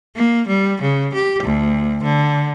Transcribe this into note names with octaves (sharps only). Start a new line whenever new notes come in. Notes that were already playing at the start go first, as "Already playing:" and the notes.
A#3
G3
C#3
G4
D2
D3